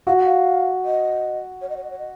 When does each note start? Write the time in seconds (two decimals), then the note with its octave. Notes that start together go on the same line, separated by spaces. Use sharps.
0.07 F#4 F5
0.16 F#5
0.25 F5
0.85 D#5
1.61 C#5
1.69 D#5
1.77 C#5
1.84 D#5
1.90 C#5
1.99 D#5